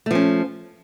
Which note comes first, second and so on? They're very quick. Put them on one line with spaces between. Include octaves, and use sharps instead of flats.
A3 F3 C#4